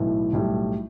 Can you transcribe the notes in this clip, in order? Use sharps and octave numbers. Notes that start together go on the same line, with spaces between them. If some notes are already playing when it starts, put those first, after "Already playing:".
Already playing: B1 A2 E3
B1 A2 G3